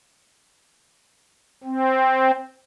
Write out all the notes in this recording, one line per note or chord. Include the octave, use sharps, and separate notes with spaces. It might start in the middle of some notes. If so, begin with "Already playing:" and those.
C4